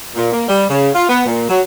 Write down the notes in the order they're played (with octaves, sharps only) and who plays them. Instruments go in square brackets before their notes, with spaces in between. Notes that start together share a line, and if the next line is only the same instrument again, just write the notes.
[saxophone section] A#2
A#3
G3
C#3
F4
B3
A#2
F#3